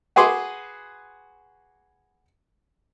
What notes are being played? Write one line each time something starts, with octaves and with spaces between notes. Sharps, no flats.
F#4 G#4 B4 C6 D6